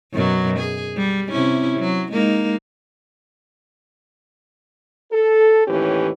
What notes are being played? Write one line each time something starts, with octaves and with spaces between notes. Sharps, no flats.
F#2 B2 F#3
G#4
G3
C3 C#4 E4
F#3
G#3 A#3 D#4
A4
D#2 A2 E3 C#4 G4